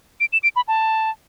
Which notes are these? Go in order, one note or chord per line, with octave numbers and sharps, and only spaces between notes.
D7
E7
D7
B5
A5